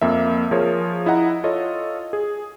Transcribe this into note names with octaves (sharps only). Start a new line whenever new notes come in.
F2 A#3 E5
F3 F4 G#4 A#4 C#5
E4 D#5 F#5 A#5
F4 A4 C#5 D#5
G#4